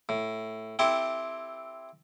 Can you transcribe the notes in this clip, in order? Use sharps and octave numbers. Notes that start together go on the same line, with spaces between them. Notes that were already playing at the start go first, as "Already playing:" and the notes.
A2
C4 E4 G4 A4